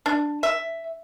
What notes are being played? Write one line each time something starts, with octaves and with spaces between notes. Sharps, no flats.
D4
E5